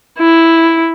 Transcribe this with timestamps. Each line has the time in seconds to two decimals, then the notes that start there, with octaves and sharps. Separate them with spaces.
0.18 E4